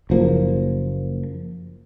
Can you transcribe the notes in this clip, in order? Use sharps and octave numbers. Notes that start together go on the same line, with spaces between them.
F#1 F3 A#3